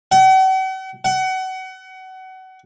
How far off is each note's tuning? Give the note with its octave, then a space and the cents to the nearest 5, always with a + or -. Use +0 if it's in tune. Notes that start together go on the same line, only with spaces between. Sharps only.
F#5 +45
F#5 +30